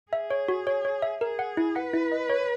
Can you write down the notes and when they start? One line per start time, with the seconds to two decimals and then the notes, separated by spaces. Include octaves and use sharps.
0.12 G#4 E5
0.30 C#5
0.48 F#4
0.67 C#5
0.85 C#5
1.02 E5
1.21 G#4 A#4
1.39 F#5
1.57 E4
1.75 B4 F#5
1.93 E4
2.12 D#5
2.30 C#5